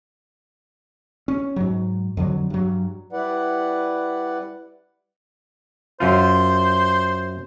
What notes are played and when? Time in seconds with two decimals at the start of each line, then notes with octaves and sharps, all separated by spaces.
1.28 C#4
1.56 G#2 F#3
2.17 F2 D3 F#3
2.50 G2 F#3
3.13 G3 E4 B4 D5 F#5
6.00 F#2 F4 C5